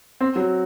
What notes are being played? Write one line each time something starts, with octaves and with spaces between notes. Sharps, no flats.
C4
F#3